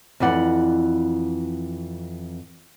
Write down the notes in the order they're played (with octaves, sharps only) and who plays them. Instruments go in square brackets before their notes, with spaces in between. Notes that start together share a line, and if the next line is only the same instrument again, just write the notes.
[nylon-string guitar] F2 E3 D5 F#5